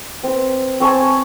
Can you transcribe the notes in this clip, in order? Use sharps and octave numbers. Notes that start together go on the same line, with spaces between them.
C4 B4
C4 C#5 G#5 A5